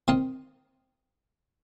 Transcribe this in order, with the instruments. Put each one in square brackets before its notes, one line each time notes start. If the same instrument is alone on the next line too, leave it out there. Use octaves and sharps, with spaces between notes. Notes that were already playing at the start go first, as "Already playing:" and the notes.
[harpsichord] D#3 C4 D#4